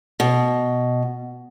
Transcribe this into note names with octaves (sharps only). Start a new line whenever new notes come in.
B2